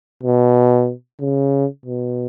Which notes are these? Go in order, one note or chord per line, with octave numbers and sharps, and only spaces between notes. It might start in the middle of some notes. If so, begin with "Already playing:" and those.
B2
C#3
B2